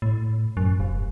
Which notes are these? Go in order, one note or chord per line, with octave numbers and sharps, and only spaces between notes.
A2
F#2
F1